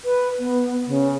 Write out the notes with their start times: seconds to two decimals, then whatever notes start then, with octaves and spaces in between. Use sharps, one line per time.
0.05 B4
0.39 B3
0.87 C#3